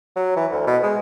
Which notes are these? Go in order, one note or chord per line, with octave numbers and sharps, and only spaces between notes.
F#3
E3
D2
B2
G#3